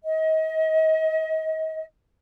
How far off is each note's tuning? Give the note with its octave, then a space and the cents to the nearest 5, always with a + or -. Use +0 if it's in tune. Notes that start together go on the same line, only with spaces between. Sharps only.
D#5 +35